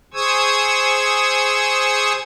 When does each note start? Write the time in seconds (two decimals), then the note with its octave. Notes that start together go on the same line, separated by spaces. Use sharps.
0.14 G#4 C5 C#6 D#6 E6 G#6